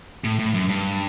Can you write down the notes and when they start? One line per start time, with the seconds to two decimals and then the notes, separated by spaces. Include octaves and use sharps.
0.24 A2
0.39 A2
0.54 F#2
0.69 G2